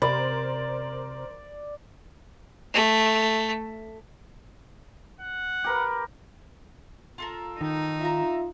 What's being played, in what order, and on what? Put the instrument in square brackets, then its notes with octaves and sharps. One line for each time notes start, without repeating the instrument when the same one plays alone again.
[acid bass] C3 [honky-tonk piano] A#4 C5 [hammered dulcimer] D5 [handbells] B5
[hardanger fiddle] A3
[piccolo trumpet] F#5
[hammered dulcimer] G4 A#4 B4
[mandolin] F4 A4 A#4
[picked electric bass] D#3 [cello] D#4
[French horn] F4 [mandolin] E5 A#5